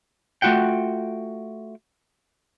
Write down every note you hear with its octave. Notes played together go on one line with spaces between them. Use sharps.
A3 F4 F#4 F#5 G5